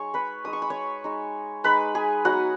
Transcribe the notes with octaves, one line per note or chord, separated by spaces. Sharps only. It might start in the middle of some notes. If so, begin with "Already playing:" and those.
Already playing: G#3 D#4 C#5 C#6
B4 B5
G#3 D#4 D#6
C#6
B5
C#5 C#6
G#3 D#4
G#3 D#4 B4 B5
G#4 G#5
F#3 B3 D#4 F#4 F#5